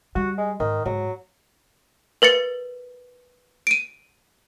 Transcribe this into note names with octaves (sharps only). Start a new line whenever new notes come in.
G3 F#4
G#3
G#2 D#3
G#2 F#3
A#4 B4 A6 C#7
D7 D#7